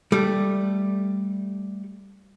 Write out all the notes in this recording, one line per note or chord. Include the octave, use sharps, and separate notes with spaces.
G3 A3